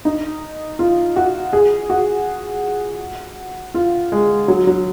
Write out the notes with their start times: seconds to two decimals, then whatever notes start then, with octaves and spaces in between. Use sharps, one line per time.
0.05 D#4
0.79 F4
1.16 F#4
1.53 G#4
1.90 F#4
3.74 F4
4.12 G#3
4.48 F#3
4.67 F#3